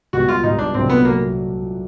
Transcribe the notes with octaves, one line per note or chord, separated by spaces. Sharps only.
C#2 B2 G3 F#4
F4
C#2 B2 G3 D#4
D4
C2 A#2 F#3 A3 C4 D4
B3
F#3 A#3